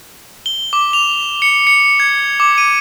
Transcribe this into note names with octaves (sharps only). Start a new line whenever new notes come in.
G7
D6
F7
C#7
C#7
G#6
D6
D#7